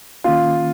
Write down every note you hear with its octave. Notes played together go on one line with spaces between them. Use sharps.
D#3 A#3 C#4 F4